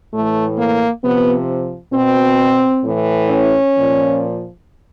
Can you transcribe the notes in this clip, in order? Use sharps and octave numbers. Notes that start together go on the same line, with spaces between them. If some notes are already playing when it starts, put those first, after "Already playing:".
A2 E3 A3
A#3
C3 F3 B3
B2 C4
A2 E3
C#4
A#2 F3